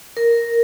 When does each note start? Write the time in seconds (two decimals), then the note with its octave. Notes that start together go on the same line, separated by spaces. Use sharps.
0.17 A#4